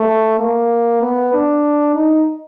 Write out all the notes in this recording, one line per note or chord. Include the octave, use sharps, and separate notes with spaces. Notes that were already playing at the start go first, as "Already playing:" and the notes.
Already playing: A3
A#3
B3
D4
D#4